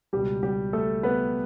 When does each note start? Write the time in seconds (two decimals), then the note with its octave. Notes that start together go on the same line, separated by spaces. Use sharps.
0.13 C#2 B2 G3 G4
0.43 G3 G4
0.73 A3 A4
1.03 B3 B4